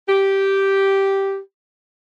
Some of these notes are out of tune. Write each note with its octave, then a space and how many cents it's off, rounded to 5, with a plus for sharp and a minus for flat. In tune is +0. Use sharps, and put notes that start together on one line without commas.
G4 -5